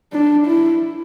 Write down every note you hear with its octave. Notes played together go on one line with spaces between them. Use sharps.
D4
E4